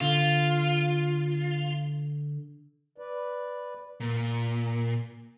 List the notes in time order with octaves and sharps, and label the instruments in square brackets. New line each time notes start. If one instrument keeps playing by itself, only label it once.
[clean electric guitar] D3 [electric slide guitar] F4
[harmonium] B4 D5
[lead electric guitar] A#2